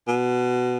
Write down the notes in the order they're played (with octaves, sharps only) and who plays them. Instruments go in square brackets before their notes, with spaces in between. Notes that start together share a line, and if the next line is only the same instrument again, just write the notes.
[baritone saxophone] B2